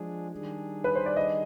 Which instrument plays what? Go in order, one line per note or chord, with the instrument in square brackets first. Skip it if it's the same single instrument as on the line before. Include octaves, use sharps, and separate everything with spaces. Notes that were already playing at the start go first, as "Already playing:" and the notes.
Already playing: [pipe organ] F3 G#3 D4 G#4
D#3 G3 D4 G#4
[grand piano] B4
C5
D5
D#5